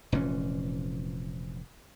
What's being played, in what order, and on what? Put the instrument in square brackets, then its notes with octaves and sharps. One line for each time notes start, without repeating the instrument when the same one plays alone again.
[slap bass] F1 A#2 E3 C#4